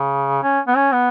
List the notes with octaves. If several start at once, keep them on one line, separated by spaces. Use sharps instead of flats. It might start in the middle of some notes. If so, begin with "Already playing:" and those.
Already playing: C#3
C#4
B3
C#4
B3